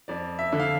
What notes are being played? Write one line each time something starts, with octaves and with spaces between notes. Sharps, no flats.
F2 D5
E5
D3
F5